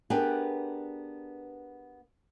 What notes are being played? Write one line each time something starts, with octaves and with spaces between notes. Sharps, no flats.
B3 D4 G4 G#4 A#4 B4